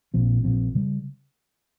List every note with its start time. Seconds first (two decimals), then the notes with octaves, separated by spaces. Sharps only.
0.14 A#1 A#2 F3 C4
0.44 A#1 A#2 F3 C4
0.75 C#3 G3